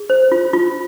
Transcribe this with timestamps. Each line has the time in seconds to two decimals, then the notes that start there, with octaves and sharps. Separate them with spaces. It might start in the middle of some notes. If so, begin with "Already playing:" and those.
Already playing: G#4
0.10 C5
0.32 F4
0.53 F4